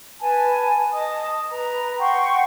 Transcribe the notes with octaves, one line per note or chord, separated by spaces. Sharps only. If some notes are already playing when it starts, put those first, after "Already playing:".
B4 G#5 A5
D#5 A5 D#6
B4 A#5
F#5 G5 C6 C#6